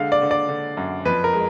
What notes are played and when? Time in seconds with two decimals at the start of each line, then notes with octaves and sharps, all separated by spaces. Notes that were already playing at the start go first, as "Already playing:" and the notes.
Already playing: D3 G#3 F5
0.12 D5
0.22 D3
0.31 D5
0.49 D3
0.77 F#2
1.05 F2 B4
1.24 A#4
1.33 G#3